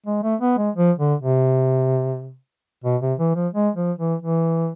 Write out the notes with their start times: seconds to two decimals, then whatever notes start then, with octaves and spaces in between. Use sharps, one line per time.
0.06 G#3
0.23 A3
0.41 B3
0.58 G#3
0.75 F3
0.98 D3
1.22 C3
2.84 B2
3.02 C3
3.19 E3
3.36 F3
3.53 G#3
3.76 F3
3.99 E3
4.22 E3